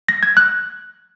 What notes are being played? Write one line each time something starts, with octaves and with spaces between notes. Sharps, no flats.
A#6
G#6
F#6